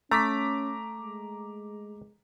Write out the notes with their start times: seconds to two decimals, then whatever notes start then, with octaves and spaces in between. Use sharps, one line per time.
0.11 A3 C#4 A#5 D6 B6
0.97 G#3